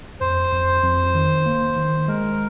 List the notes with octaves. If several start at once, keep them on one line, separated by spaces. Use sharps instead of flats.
F2 C5
F2
F2
D#3
A#3
D#3
G#3 A#4